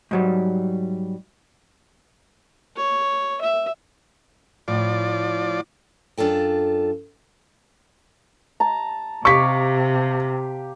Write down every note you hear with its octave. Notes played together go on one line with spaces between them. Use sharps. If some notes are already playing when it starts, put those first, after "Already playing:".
G#2 F#3 G3
C#5
E5
A2 F3 D5
F#2 D4 F4 A4 G5
A5 A#5
C3 G4 F5 C#6 B6